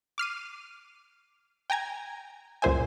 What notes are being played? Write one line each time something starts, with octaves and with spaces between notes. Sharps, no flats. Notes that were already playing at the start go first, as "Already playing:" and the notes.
D6 F6 C7 D#7
G5 G#5 A#5 G#6
C#2 F#2 A#2 C5 E5 G#5